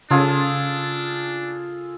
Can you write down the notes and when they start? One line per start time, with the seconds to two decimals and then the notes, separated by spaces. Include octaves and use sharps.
0.11 C#3 D4 F4 G#4 A4